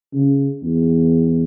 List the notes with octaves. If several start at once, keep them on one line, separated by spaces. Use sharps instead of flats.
C#3
E2